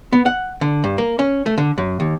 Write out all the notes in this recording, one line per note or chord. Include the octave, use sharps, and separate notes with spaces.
B3
F#5
D3
G2
A#3
C#4
A3
D3
F#2
D#2